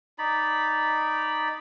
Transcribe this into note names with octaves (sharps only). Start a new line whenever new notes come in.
D#4 D5 B5